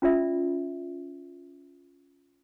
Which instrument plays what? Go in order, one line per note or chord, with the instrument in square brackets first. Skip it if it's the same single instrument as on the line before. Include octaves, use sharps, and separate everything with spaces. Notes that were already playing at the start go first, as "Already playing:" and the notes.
[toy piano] C#4 F4 D5 E5